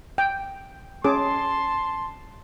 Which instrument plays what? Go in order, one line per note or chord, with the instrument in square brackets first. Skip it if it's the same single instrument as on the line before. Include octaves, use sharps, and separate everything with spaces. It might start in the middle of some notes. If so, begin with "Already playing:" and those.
[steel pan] G5
[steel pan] C#4 G#4 D6 [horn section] A5 C6